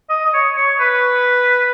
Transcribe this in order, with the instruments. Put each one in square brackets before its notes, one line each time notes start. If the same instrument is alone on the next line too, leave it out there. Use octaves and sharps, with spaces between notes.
[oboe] D#5
D#5
C#5
C#5
B4